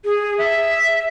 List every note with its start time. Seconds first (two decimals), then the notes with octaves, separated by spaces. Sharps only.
0.05 G#4
0.38 E5